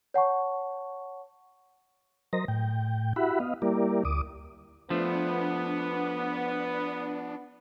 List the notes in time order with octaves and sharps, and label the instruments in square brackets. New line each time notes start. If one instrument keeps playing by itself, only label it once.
[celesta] C#5 F#5 A5 C#6
[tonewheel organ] F#3 A#4 C5 D#5 A#6
A2 G5
E4 F#4 G4 E5 F#5 B5
B3 D#5 F5
G3 A#3 E4 G4 A#4 D5
D2 D6 D#6
[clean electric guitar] F3 A3 [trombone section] B3 [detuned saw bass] D4